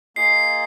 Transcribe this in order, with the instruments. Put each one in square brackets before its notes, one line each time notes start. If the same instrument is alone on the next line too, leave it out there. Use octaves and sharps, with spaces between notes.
[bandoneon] A#3 F4 G#4 D#5 [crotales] C7